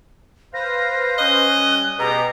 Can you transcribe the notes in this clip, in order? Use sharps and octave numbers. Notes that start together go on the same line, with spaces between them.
B4 C5 F5 A#6
C#4 D#5 F#6
G3
B2 G4 G#4 A#5